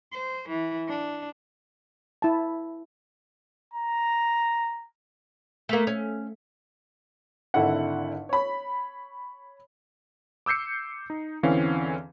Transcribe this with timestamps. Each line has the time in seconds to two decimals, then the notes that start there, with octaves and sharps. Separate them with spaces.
0.13 C5
0.50 E3
0.89 D4
2.22 E4 A5
3.74 A#5
5.69 A3 A#3
5.87 C#4
7.54 G#1 D3 E4 F#5
8.29 C#5 B5
10.46 D6 E6 G6 C7 C#7
11.10 D#4
11.43 E2 D3 E3 C4 C#4 F5